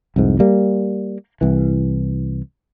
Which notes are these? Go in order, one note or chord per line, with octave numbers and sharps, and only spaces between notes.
C2 F2 G#2
G3 A#3
C2 E3